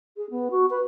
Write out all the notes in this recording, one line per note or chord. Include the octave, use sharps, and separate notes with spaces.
G#4
B3
F#4
B4